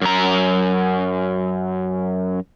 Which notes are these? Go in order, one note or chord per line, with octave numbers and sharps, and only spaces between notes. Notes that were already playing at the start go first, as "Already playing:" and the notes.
F#2 A#5